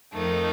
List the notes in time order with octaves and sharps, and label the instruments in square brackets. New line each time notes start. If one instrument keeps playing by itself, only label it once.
[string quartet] F2 D#3 A3 D#4